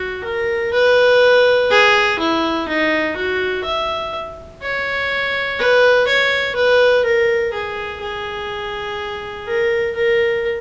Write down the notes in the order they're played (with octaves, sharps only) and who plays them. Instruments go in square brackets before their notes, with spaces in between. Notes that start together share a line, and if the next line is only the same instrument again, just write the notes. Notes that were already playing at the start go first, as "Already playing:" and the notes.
Already playing: [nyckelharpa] F#4
A#4
B4
G#4
E4
D#4
F#4
E5
C#5
B4
C#5
B4
A#4
G#4
G#4
A#4
A#4